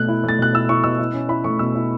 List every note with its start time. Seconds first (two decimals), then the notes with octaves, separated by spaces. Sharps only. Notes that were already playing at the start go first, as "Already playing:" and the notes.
Already playing: B2 A3 F#6
0.08 E4
0.24 A3 A6
0.39 B2 F#6
0.53 E4 E6
0.69 E4 C#6
0.84 B2 E6
0.99 E4
1.14 C#4
1.29 E4 B5
1.44 A3 C#6
1.59 B2 E6
1.75 E4